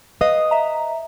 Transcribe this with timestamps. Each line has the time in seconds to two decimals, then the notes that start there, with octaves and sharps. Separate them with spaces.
0.21 B4 D#5 F5 D#6
0.51 E5 A#5